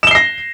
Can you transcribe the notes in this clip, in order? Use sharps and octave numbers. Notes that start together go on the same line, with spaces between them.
A#6 C7 E7 G7